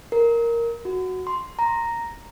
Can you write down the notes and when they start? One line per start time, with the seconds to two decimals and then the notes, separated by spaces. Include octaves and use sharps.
0.12 A#4
0.85 F#4
1.27 C6
1.59 A#5